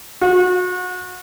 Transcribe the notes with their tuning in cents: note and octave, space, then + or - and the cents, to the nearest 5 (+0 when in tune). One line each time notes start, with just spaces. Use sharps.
F#4 -30